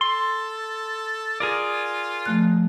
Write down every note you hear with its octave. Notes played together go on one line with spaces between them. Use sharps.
A4 C6
F4 G#4 A#4 D5
F3 A3 F#6